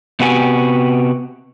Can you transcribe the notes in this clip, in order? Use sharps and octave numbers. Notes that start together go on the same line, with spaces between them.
C3 B3 F#4 G4 G#5